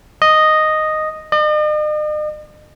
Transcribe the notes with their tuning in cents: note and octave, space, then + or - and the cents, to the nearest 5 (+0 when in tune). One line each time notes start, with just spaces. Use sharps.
D#5 -5
D#5 -45